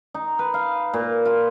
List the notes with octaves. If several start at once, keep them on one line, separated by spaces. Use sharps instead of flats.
D#4
B4
F5
A#2
F4